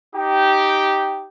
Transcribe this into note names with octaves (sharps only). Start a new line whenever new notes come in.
D#4 G4